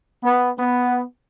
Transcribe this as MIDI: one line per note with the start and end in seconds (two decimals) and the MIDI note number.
0.24 0.50 59
0.57 1.02 59